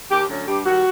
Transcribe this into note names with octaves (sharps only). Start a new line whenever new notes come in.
D#2 G4
D3 F#3 A3 C#4
G2 G4
D#3 G3 F#4